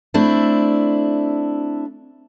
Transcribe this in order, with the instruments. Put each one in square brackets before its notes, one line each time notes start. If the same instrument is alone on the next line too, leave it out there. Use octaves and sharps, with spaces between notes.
[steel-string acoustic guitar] A3 C4 D4 E4